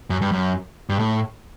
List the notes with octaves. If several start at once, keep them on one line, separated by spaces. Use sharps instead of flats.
F#2
G2
F#2
G2
A2